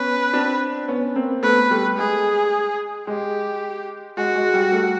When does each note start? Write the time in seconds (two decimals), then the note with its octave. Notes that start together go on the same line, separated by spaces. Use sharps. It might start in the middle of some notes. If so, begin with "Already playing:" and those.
Already playing: B3 C#4 B4
0.33 C4 D4
0.88 B3 C#4
1.15 A#3 C4
1.43 A3 B3 B4
1.70 G3 A3
1.97 G#3 G#4
3.07 G#3 G4
4.17 G#3 F#4
4.35 G#3
4.54 G3
4.72 G3 A3